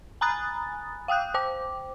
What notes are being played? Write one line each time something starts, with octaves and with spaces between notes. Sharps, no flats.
G#5 A#5 B5 D#6 F#6 A6
F5 G5 D#6 F#6 G6
C5 G5 D6